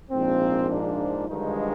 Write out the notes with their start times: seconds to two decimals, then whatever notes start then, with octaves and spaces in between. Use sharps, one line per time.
0.11 A#1 G#2 F3 A#3 C4
0.69 D4
1.29 G2 D3 D#3 F3 G#3 D#4